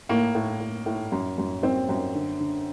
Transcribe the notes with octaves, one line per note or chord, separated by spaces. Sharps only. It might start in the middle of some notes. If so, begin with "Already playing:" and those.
A2 A#3
A2
A2
A2
F#2
F#2
F#2 C4
F#2
D3
D3